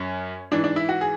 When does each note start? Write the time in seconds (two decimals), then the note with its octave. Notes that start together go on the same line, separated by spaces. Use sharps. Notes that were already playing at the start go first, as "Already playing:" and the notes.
Already playing: F#2 C#4
0.51 G#2 E3 D4
0.64 D4
0.76 E4
0.89 F#4
1.01 G#4